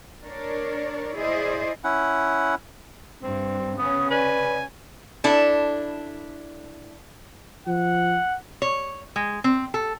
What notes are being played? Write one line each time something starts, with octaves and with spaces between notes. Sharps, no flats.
D4 A#4 C#5 D5
E4 G#4 C5 D5 D#5
C#4 E4 F#5
G2 C4
C#3 B3 C#4 D#6
B4 D5 G#5
D4 E4 A4
F3 F#5
C#5
G#3
C4
A4